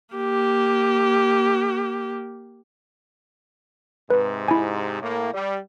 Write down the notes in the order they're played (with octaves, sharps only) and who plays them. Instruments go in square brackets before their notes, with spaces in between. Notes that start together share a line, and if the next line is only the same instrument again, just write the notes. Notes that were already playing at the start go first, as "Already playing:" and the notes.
[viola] A#3 G4
[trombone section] G#2 C3 [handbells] B4
[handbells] E4 G#5
[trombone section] A2 A#3
G3